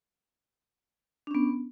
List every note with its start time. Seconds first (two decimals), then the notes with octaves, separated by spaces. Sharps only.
1.27 D4
1.31 C#4
1.35 B3